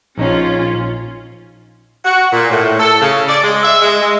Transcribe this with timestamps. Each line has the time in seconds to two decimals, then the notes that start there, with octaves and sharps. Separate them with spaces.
0.18 A#1 C#4 D#4 F4 C#5
2.05 F#4
2.32 A#2
2.51 A2
2.80 A4
3.01 C#3
3.27 D5
3.44 G#3
3.63 E5
3.82 G#3
4.02 G#3